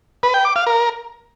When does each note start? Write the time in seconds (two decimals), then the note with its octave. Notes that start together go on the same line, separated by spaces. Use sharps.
0.23 B4
0.34 G5
0.45 D6
0.56 F5
0.67 A#4